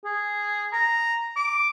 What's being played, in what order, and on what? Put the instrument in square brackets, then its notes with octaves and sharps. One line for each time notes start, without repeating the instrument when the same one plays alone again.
[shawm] G#4
A#5
D6